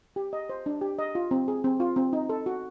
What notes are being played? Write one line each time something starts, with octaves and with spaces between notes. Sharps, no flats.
G4
D#5
C5
D4
G4
D#5
F4
C4
G#4
C4
F4
C4
D#4
A4
F#4